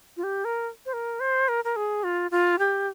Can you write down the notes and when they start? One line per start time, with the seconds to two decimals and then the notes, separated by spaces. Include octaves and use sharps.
0.17 F4
0.23 G4
0.45 A#4
0.86 C5
0.93 A#4
1.20 C5
1.48 A#4
1.64 A#4
1.76 G#4
2.04 F4
2.31 F4
2.59 G4